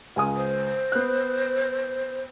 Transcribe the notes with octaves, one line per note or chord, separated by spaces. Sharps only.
C#2 G#5 D#6
C5
B3 F#6